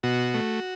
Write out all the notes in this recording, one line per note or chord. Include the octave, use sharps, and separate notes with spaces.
B2 F#4
A3